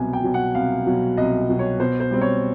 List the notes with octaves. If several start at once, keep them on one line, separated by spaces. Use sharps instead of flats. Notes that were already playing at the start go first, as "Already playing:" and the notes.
Already playing: C2 B2 F#3 G#5
G5
B2 F#3
F#5
C2 F5
B2 F#3
C2 D#5
B2 F#3
C#5
B2 C5
C5
G3 C4
C#5